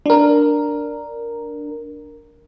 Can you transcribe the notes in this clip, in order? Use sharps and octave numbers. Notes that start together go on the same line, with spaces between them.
D4 A#4